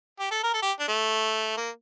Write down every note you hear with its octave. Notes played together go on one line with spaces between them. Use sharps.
G4
A4
A#4
A4
G4
D4
A3
A#3